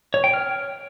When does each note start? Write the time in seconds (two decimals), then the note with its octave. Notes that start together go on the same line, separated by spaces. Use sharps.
0.14 C#5
0.24 G5
0.34 F6